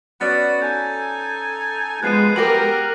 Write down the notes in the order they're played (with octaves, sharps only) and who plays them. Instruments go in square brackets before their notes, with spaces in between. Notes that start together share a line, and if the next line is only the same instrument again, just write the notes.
[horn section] B3 F#4 [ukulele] C#4 D5 [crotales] A6
[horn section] D#4 A4 G#5 [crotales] G6
[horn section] F3 B3 [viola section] G#3 [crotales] F#6 C7 D#7
[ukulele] F#4 G4 G5 [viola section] A#4 [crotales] D6 A#6 F#7